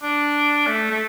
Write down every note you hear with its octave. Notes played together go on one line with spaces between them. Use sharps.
D4
A3
A3